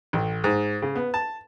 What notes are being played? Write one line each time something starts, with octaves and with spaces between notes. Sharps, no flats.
A1
G#2
C#3
B3
A5